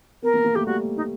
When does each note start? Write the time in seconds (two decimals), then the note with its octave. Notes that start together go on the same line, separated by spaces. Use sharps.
0.22 B3 A#4
0.34 A#3
0.45 A#3
0.55 A3 G4
0.66 G3 F#4
0.96 D#4